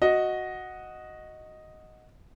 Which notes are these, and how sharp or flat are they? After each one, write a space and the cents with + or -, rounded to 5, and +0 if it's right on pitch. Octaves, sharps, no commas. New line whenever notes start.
F#4 -5 D#5 +0